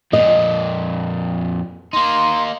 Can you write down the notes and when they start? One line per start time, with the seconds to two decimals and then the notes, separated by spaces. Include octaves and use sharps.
0.13 F2 A#2 D#5
1.93 A#3 D#4 C6